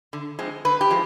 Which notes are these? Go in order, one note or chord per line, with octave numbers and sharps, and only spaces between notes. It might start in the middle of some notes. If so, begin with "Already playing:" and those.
D3
F3 G#3 C4
D3 B4
G4
F3 G#3